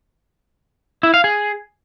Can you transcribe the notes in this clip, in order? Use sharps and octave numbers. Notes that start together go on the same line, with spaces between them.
E4
F5
G#4